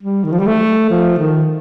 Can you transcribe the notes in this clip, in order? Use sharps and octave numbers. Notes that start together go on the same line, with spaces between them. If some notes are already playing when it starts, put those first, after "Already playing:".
G3
D#3
F3
G3
A3
F3
D#3